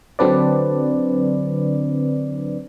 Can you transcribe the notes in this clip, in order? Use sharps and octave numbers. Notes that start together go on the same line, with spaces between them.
D3 F#3 C4 D4 B4 D5